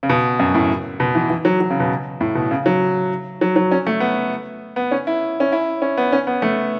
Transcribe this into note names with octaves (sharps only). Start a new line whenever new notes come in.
C#3
B2
F#2
A2
B2
E3
E3
F#3
F#3
C#3
B2
A2
B2
C#3
F#3
F#3
F#3
C#4
A3
B3
B3
C#4
E4
C#4
E4
C#4
B3
C#4
B3
A3